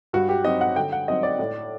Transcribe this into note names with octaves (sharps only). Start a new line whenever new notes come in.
G2 F#4
G4
F#3 C4 D#4 D#5
F#5
D3 G5
F#5
F#3 C4 D#4 D#5
D5
A2